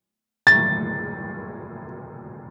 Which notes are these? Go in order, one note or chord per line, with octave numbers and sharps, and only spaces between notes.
A6